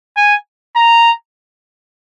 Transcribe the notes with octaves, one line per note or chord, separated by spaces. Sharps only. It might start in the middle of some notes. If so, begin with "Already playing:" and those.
G#5
A#5